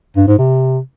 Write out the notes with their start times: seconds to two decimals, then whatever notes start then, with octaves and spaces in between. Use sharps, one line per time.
0.16 G2
0.27 G#2
0.38 C3